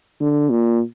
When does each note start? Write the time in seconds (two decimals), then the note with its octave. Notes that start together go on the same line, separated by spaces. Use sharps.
0.21 D3
0.50 A#2